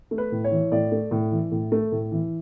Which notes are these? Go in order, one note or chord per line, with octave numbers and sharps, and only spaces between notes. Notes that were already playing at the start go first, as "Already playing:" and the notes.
A3
B4
A2
C#5
E3
A2 D5
A3
A2
E3
A2
A3
A2
E3